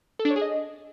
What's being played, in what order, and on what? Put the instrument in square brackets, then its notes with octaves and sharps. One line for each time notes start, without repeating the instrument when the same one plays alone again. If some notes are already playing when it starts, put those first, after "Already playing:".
[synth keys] A4
D4
C#5
G#4
D#5